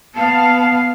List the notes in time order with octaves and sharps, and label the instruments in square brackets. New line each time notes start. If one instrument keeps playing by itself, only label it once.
[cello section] B3 F5 [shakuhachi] A5